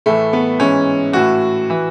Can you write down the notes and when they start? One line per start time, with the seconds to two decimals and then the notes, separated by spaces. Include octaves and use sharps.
0.06 A2 E3 A3
0.33 B3
0.59 G#2 E3 C#4
1.13 A2 E3 F#4
1.70 E3